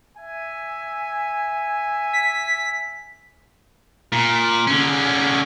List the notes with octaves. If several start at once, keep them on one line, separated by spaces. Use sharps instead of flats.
E5 G#5
B6
A#2
D3 C#4